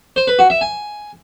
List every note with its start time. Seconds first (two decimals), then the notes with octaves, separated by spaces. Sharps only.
0.16 C5
0.28 B4
0.39 F#4
0.50 E5
0.61 G#5